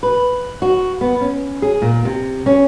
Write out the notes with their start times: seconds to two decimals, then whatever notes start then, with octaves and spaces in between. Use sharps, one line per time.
0.03 B4
0.62 F#4
1.01 B3
1.21 C#4
1.62 G#4
1.82 A#2
2.05 C3
2.46 C#4